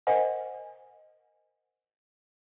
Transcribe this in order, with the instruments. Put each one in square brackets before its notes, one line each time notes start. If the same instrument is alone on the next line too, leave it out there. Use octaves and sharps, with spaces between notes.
[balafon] A#4 C5 D#5 F#5 G#5